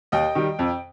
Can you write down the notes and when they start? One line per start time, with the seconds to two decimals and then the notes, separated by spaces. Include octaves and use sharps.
0.12 D#2 D#5 G5
0.35 D#3 G3
0.59 F2